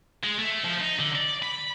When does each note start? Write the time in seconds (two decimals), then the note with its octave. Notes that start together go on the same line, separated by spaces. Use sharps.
0.24 G#3
0.39 A3
0.64 F3
0.81 D#4
0.99 D3
1.15 D5
1.42 B5